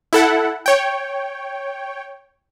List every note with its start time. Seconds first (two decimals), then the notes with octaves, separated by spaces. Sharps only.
0.13 E4 A4 F#5
0.66 C#5 G5